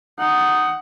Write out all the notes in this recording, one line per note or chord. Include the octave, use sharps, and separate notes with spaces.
D#4 F#5